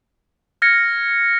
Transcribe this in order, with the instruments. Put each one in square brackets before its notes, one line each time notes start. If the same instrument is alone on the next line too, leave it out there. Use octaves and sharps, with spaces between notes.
[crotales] F6 G#6 A#6 C#7